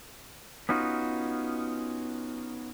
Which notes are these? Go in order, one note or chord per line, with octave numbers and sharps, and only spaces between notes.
B3 C#4 D#4 F4 F#4